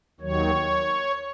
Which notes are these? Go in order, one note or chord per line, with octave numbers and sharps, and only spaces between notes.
D#2 D#3 F#3 C#5